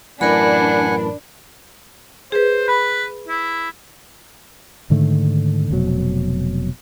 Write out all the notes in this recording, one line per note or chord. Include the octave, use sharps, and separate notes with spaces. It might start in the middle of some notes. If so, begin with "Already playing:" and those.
F#2 A2 E3 D4 A#4 F#5 G#5 B5
G#4 B4 C5
B4 B5
E4
G#2 D3 D#3 A3
F1 B2 F#3